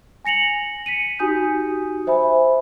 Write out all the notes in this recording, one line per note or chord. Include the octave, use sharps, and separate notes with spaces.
G#5 A#6 C#7 F7 F#7
B6 C#7 D#7
D#4 F#4 G4 G#5 D#6 G6
C5 E5 G#5 B5